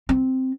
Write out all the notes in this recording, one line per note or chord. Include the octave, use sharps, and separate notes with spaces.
C4